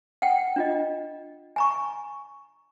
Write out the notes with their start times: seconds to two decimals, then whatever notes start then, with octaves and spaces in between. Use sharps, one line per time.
0.22 F#5 G5
0.56 D4 F4 D#5
1.56 G#5 A#5 C#6